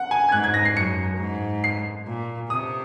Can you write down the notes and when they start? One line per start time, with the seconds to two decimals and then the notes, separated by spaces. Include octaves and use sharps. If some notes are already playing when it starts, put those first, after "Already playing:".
Already playing: F#5
0.11 G#5
0.29 G#6
0.32 G#2 F#6
0.44 G#6
0.54 A#6
0.65 C7
0.75 F#2 C#7
1.19 G#2
1.64 C7
2.07 A#2
2.50 C3 D#6